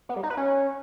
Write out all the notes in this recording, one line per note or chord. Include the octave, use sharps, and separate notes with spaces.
B3
G3
D#4
B4
C#4